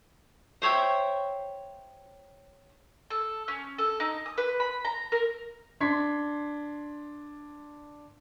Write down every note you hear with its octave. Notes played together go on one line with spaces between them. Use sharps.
C5 C#5 E5 G5
A4
C#4
A4
D#4
D#6
B4
B5
A#5
A#4
D4 C6 G#6 B6